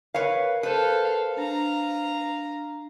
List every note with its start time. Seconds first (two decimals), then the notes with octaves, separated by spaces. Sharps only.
0.14 A#4 B4 C#5 F5
0.63 A4 B4 C5 F5
1.37 D4 F5 A#5